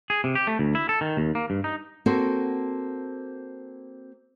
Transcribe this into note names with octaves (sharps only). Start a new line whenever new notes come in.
G#4
C3
G4
A3
D2
E4
A4
D#3
D#2
A#3
G2
D#4
A#3 C4 F#4 A4 C5